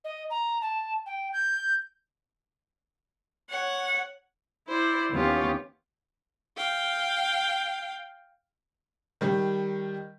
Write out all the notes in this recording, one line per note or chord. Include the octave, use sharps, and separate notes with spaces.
D#5
A#5
A5
G5
G6
C#5 F#5
E4 C5 D5
D#2 B3 C#4 F4 G4 C#5
F5 G5
D#3 G3